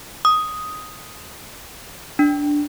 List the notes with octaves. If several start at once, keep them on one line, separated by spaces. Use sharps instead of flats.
D#6
D4